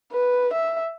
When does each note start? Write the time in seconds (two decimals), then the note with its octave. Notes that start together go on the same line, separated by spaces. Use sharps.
0.12 B4
0.53 E5